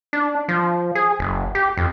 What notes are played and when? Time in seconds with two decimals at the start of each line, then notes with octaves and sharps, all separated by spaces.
0.13 D4
0.48 F3
0.95 G#4
1.19 F#1
1.55 G4
1.77 F2